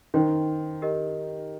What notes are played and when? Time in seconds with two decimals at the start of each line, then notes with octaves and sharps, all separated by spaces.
0.14 D#3 C5 G5 C6
0.82 G4 A#4 D#5